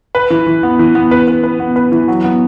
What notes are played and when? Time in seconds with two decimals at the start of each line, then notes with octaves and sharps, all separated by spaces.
0.15 B4
0.30 E3
0.47 E3
0.63 B3
0.79 E3
0.95 B3
1.11 B4
1.28 B4
1.44 B4
1.60 B3
1.76 B4
1.92 E3
2.08 F#3
2.24 B3